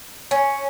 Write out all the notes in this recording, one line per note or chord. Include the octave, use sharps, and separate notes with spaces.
C#4